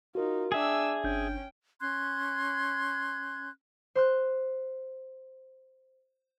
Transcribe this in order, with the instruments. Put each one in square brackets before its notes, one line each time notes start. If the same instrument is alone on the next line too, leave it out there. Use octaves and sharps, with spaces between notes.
[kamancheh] D#4 F4 [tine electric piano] F#4 A#4
[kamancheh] D4 E6 [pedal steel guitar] G#4 E5 [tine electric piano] G5
[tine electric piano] G1 D4 G6 [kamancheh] C#4 G5
[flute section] C#4 C6 F#6 G#6
[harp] C5 C6 F#6